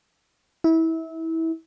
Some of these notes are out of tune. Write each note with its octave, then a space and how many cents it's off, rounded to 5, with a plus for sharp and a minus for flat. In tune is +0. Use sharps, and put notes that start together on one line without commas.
E4 -25